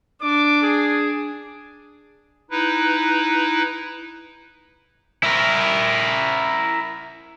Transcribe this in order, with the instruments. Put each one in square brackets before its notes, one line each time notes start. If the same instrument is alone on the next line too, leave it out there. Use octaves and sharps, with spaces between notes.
[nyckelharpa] D4 [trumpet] D6
[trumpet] G#4
[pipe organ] D#4 E4 B4
[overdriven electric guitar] E4 A#4